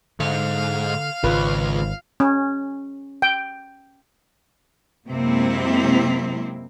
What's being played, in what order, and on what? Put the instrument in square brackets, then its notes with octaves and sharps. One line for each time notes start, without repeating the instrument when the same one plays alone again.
[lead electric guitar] G#2 [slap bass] D3 [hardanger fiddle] F5
[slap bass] G#1 [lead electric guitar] C#2 [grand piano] F4 B4
[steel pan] C#4
G5
[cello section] F#2 C3 G#3 A#3 C4 E4